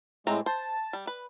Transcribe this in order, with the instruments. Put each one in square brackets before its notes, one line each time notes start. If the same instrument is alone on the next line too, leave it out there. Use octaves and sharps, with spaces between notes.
[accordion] A2 G#3 [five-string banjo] A3 C4 A#5
[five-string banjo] C5 [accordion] A5
[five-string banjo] G3
B4